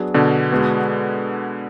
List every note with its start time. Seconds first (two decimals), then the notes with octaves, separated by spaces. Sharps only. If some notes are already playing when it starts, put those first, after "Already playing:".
Already playing: F#3 B3 D4 G#4
0.14 B2 D3
0.52 G#3 B3 F#4